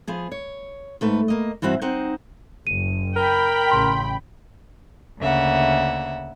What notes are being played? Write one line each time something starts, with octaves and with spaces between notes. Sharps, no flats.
F3 B3 G#4
C#5
G#2 A3 B4
A#3 D#5
G2 E3 C4 F#4 E5
C4 D#4 C5 F#5
F#1 D#7
A#4 G5 B5
A1 C#3 C6
D2 C#3 A#3 E5 F#5